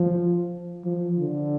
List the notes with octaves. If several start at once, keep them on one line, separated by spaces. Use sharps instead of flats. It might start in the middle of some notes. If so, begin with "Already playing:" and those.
Already playing: F3
F3
D3